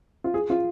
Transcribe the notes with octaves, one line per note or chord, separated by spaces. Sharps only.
F4
G#4
F4